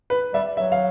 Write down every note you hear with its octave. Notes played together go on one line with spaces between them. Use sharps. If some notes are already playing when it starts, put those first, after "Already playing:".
B4
G3 E5
F#3 E5
F5